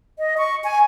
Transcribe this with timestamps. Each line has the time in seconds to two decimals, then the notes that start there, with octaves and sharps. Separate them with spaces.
0.19 D#5
0.38 C#6
0.64 G#5